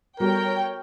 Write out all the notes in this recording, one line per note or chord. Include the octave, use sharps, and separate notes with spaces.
G3 B3 F#4 A4 A#4 C#5 G5